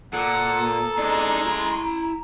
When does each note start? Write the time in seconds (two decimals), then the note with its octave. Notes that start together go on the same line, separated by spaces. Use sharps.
0.13 A#2 A4 F#5 A#5
0.98 G#3 D4 D#4
1.46 E4 C6